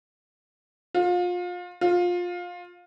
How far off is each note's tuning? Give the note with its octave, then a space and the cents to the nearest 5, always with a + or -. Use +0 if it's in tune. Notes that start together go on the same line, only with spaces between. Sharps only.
F4 +30
F4 +20